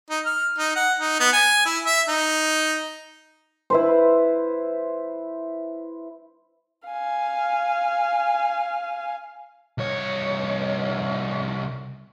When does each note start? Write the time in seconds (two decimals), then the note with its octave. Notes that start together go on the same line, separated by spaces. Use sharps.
0.10 D#4
0.26 F6
0.58 D#4
0.75 F#5
0.99 D#4
1.20 B3
1.33 G#5
1.66 E4
1.86 E5
2.08 D#4
3.70 E4 B4 C5
6.88 F5 G#5
9.78 C2 C#5